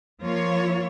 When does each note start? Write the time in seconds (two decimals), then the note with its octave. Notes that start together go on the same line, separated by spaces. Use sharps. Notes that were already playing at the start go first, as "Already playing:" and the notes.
0.23 F3 A#3 F4 C#5